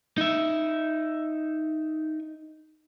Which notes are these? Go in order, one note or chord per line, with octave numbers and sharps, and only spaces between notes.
D#4 E5